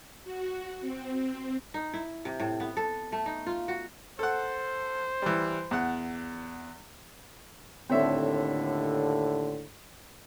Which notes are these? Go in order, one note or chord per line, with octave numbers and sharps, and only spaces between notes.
F#4
C4
D#4
E4
C3
A2
B3
A4
A3
D#4
F4
F#4
A4 C5 F#5
E3 G3
E2 F#5
D#2 A2 D3 C4 C#5 E5